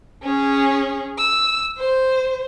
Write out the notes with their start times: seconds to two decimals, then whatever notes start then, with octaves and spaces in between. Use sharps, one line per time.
0.23 C#4 G#4
1.18 E6
1.78 C5